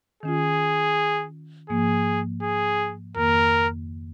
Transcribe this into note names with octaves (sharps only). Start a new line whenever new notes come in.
D#3 C#4 F4 G#4
G#2 F3 A#3 G#4
G#4
F2 D#3 A#3 A#4